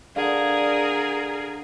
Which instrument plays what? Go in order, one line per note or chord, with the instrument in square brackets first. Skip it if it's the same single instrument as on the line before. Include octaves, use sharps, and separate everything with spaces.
[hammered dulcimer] D3 F5 [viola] G#4 A#4